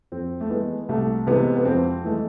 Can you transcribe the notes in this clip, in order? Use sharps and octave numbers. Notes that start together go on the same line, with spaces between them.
F2 C4
A3
E3 G#3 B3
C2 A3
C3 E3 G#3 B3
B3
F2 C4
E3 G#3 A3